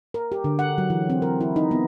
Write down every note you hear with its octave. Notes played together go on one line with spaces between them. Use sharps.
A#4
G4
D3
F#5
F#3
E3
C4
A#4
E4
D#4
B3